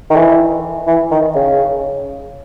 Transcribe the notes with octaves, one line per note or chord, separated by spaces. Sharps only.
D#3
E3
E3
D#3
C#3